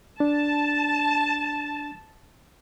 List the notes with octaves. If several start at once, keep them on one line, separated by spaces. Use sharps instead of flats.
D4 A5